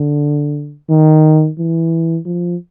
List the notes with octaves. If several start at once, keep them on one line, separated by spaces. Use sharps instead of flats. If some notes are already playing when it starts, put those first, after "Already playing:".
Already playing: D3
D#3
E3
F3